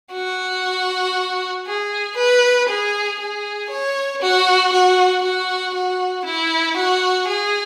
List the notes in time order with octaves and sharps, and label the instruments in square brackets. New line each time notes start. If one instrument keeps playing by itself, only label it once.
[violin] F#4
G#4
B4
G#4
G#4
C#5
F#4
F#4
F#4
F#4
E4
F#4
G#4